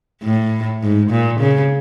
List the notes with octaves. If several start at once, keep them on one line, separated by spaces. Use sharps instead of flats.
A2
G#2
A#2
C#3